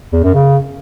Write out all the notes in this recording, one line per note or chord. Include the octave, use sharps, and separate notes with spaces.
E2
F#2
C#3